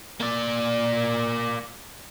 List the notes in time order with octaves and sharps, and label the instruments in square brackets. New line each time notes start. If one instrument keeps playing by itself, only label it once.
[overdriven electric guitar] A#3 D5